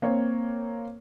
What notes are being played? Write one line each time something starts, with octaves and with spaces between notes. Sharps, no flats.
A#3 C4 C#5